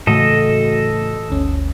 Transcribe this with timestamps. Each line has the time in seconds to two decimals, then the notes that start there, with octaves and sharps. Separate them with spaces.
0.07 A2 C#3 E3 A3 F#4 A4 D#5
1.29 G1 D2 C#4